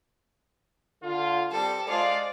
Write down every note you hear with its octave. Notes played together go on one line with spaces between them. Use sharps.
D3 F4
G3 C4 A4
G#3 F4 C5 D5